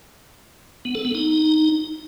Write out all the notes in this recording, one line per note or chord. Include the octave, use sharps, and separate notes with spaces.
B3
A4
B3
D#4